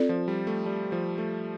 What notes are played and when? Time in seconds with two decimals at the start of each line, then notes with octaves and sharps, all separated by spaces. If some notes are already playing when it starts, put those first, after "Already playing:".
Already playing: C4 F4 A4 D5
0.09 F3
0.28 G3
0.47 A3
0.66 G3
0.92 F3
1.18 A3